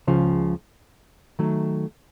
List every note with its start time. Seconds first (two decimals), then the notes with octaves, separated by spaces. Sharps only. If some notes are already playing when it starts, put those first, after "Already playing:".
0.07 C#2 C#3 F3
1.39 D#3 F#3 A3